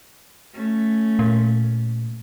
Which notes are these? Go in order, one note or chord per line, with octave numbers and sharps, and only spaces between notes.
A3 C#4
A#2